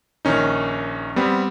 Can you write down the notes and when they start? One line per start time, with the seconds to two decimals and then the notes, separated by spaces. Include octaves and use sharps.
0.25 A#1 D#3 C#4 D#4
1.16 G3 B3 C4